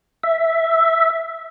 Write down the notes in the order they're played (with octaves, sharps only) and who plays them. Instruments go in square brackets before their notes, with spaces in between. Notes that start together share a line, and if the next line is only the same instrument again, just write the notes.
[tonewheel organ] E5